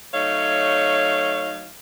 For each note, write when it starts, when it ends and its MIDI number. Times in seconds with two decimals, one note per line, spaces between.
0.14 1.69 54
0.14 1.69 57
0.14 1.69 63
0.14 1.69 73
0.14 1.69 77